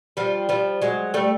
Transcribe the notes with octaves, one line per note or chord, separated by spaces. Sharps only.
F3 G3
F3 G3
F#3 G#3
G3 A3